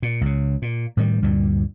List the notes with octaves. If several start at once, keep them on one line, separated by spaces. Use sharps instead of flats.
A#2
C#2 C#3
A#2
A2 D#3 E3 G3
D2 G2 A#2 G3